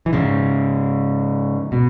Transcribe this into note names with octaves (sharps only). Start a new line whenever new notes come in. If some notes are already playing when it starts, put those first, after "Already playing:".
E3
G#2 C#3
B2